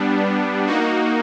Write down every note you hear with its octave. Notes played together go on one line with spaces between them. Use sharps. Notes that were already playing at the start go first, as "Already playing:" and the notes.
Already playing: G3 B3 D4
A#3 D#4 F#4